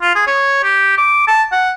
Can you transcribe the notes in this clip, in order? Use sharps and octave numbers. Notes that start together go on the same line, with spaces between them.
F4
G#4
C#5
G4
D6
A5
F#5